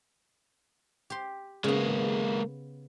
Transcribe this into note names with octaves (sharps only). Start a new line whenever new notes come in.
G4 C6
C#3 G#3 A#3 B3